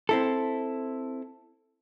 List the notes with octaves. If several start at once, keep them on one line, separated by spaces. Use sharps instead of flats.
C4 E4 A4